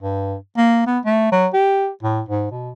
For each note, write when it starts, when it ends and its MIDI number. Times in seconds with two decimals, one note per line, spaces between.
0.01 0.35 43
0.57 0.82 58
0.87 0.99 59
1.05 1.30 57
1.32 1.47 54
1.53 1.88 67
2.03 2.21 45
2.28 2.48 44
2.51 2.71 47